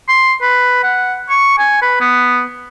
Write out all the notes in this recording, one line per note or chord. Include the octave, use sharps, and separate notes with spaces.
C6
B4
F#5
C#6
G#5
B4
B3